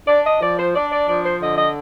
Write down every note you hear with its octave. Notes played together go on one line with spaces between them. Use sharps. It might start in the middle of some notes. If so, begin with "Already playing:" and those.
D4 D5
D#5
F3 D5
C5
D4 D5
D5
F3 D5
C5
D3 D#5
D#5